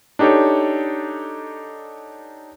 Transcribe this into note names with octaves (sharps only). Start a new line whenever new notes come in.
D4 D#4 G4 A4 C#5